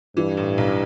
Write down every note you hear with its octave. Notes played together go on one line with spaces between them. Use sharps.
G2 E3
A2
B1